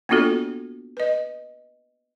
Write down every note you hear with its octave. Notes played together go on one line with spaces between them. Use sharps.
A#3 B3 D4 F4 F#4 A4
B4 D#5